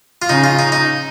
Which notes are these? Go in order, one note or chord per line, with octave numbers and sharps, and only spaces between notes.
F4
C#3 D#4
F4
D#4
D#4